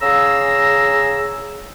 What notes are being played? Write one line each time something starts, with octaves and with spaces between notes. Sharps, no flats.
C#3 C#4 G#4 F5 A#5 E6